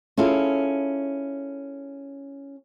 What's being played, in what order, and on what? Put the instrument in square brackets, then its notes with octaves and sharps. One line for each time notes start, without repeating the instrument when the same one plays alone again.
[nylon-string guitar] C#4 E4 F4 G#4 A4